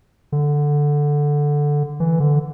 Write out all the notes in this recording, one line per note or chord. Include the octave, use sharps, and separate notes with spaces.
D3
E3
D3